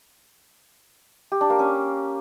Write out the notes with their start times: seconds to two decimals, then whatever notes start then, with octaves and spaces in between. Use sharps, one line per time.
1.32 G4
1.41 D4
1.50 A#3
1.59 C#4